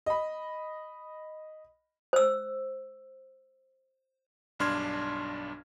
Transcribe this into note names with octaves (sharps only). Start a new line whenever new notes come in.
D#5 B5
C5 E6
B1 G2 D4 C6 F6 G#6